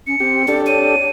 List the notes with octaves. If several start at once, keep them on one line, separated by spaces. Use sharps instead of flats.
C#4 C#7
C4 G4
D4 G4 A4 D5
C#5 D#7